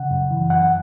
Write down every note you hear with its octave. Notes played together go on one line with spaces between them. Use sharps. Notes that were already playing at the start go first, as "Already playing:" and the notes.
Already playing: C#3 F#5
F#2
E3
F#2 F#5